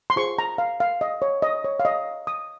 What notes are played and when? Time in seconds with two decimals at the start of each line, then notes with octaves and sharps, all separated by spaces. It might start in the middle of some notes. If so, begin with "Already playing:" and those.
0.10 C6
0.16 F4 G#4 C5 C#6
0.39 A#5
0.58 F5
0.80 F5
1.01 D#5
1.22 C#5
1.42 D#5
1.64 C#5
1.80 F5
1.85 D#5
2.27 D#6